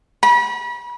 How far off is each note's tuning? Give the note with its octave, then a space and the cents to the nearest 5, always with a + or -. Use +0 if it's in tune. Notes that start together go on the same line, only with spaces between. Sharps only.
B5 -35